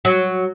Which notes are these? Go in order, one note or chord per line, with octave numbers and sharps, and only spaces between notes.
F#3